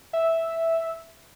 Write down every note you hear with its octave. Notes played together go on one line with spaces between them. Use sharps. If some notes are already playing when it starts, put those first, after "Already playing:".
E5